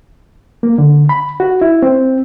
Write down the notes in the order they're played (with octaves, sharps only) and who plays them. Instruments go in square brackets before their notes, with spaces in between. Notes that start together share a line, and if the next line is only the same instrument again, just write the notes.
[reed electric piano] A#3
D3
B5
F#4
E4
C4